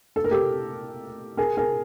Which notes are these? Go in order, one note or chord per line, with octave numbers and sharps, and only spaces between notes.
A4
A#4
G4 A4
G#4 A#4
G#4 A#4